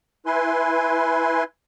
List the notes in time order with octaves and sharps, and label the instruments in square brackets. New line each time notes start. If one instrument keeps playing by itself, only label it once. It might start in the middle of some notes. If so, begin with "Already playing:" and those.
[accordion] E4 B4 G#5 C6